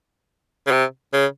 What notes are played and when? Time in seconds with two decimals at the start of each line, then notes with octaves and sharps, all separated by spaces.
0.67 C#3
0.71 C3
1.13 C#3